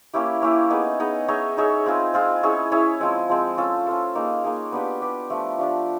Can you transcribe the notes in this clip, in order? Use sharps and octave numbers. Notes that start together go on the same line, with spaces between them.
A#3 C#4 E4 G4
A#3 C#4 E4 G4
B3 D#4 G#4
B3 D#4 G#4
D#4 G#4 C#5 E5
D#4 G#4 C#5 E5
C4 F4 G#4
C4 F4 G#4
C#4 E4 G#4 C#5
C#4 E4 G#4 C#5
F3 G#3 C4
F3 G#3 C4
C#4 F4 A4
C#4 F4 A4
A#3 D#4 G#4
A#3 D#4 G#4
B3 D4 G4 B4
B3 D4 G4 B4
F3 A3 D4 G4
F3 A3 D4 G4